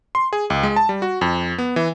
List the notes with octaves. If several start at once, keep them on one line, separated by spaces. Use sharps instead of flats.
C6
G#4
C#2
G#3
A5
G3
F#4
F2
B3
E3